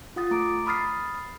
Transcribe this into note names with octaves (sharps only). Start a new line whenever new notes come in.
F4 F#5 D#6 A6
A3 A#5 D6 D7
B5 D#6 F6 A6 C7